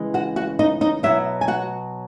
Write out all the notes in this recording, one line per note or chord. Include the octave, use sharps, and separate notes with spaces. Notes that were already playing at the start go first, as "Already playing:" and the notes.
Already playing: C#3 E3 G#3
F#4 F#5
F#4 F#5
D#4 D#5
D#4 D#5
B2 F#3 E4 E5
G#5
F#4 F#5